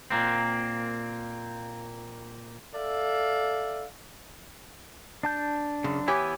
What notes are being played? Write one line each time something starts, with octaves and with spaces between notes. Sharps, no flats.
A#2 A#3 C4
A4 D5 E5 F5
D4 A5 G6
F#2 C#3
E3 B3 E4 G4 C#5 G#5